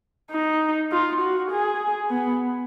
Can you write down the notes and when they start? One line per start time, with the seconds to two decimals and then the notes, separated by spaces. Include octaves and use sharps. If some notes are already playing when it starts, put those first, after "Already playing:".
0.31 D#4
0.92 F4
1.21 F#4
1.51 G#4
2.10 B3